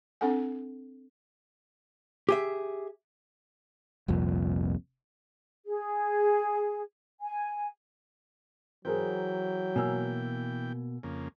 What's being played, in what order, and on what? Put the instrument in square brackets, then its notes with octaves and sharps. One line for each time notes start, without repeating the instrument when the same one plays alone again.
[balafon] C4 D4 A4 F#5 G#5
[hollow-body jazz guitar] G4 G#4 E5
[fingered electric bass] F1 C2 F2 A#2
[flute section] G#4
G#5
[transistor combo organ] E3 G5 [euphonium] F#3 [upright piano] G#4 A#4 C5
[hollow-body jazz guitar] B2 A#3 [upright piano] G#5 E6
[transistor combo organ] F2 C#3 A#3